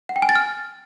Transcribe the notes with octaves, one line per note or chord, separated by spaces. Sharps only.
F#5
G5
G#5
A6
F6